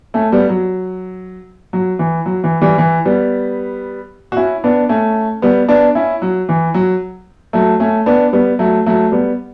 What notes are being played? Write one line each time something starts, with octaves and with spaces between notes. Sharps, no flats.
A3 C#4
G3 B3
F#3
F#3
E3
F#3
E3
E3 G3
E3
G3 B3
F#4
C#4 E4
B3 D4
A3 C#4
G3 B3
B3 D4
C#4 E4
F#3
E3
F#3
F#3 A3
A3 C#4
B3 D4
G3 B3
F#3 A3
F#3 A3
G3 B3